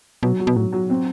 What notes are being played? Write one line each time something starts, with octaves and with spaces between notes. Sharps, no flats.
B2 F#3
F#3
B2
A2 F#3
F#3
C4